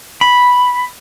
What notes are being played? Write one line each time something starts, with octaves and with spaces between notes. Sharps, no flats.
B5